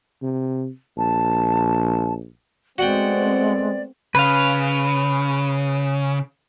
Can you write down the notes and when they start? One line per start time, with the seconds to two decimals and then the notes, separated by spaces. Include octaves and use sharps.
0.22 C3
0.97 A#1 A5
2.78 G#3 A3 B3 C4 F#4 D5 F#5 G5
4.15 C#3 B4 F5